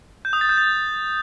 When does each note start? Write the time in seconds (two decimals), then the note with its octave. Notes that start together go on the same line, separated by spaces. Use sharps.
0.25 G6
0.33 D#6
0.41 A6
0.49 G6
0.57 A6